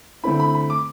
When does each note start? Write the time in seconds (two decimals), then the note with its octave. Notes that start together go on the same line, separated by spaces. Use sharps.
0.23 D3 A3 C4 E4 B5
0.40 B5
0.55 B5
0.70 D6